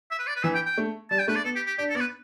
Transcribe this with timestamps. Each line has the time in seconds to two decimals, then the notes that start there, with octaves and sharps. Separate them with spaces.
0.11 E5
0.19 B4
0.27 D5
0.36 B4
0.43 E3 E5
0.54 G5
0.66 G5
0.78 A3
1.11 G3 A5
1.19 G5
1.28 A3 B4
1.36 D5
1.44 B3 A4
1.55 G4
1.67 G4
1.78 D4 G4
1.89 A4
1.95 B3 D5
2.00 B4